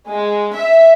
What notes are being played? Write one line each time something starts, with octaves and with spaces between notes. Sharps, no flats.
G#3
E5